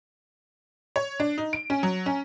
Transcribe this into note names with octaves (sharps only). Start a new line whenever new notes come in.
C#5
D4
D#4
D7
C#4
F#3
C#4